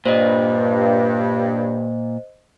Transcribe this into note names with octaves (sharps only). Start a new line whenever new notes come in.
G2 A#2 C5 D#5